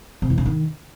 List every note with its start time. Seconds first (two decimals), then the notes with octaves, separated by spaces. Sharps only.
0.22 C3
0.30 E2
0.38 C#3
0.46 D#3